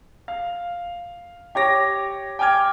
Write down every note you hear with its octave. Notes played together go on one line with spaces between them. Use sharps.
F5
G4 C#5 D6 A#6
G5 G#5 D6 F6 G#6